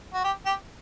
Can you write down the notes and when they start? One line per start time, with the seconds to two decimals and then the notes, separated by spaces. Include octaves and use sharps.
0.14 F#4
0.24 G4
0.46 G4